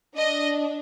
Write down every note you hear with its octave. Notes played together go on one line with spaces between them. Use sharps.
D4 D#5